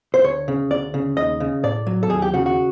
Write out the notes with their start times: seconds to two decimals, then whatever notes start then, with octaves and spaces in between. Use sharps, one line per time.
0.14 C5
0.24 D2 C#5
0.48 C#3
0.71 D2 D5
0.94 C#3
1.17 D#2 D#5
1.40 C#3
1.63 A2 D5
1.87 F#3
2.03 A4
2.10 D#2 G#4
2.22 G4
2.34 C#3 F#4
2.46 F#4